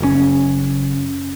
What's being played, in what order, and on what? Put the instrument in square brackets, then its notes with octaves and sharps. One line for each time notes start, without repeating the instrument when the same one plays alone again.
[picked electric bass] F#1 A2 C#4